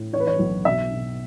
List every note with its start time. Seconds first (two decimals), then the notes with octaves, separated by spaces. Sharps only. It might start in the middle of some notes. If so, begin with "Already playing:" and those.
Already playing: A2
0.13 E3 C#5
0.20 B4
0.27 C#5
0.39 B1
0.65 B2 E5
0.91 B2